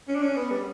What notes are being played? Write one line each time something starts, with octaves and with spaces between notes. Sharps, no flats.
C#4
D4
C#4
B3
G3